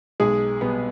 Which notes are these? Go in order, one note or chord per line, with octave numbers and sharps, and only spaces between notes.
B1 G#3 G#4
B2 G3 B3